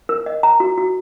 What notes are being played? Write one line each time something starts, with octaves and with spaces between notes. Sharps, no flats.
A#4
D#5
A#5
F#4
F#4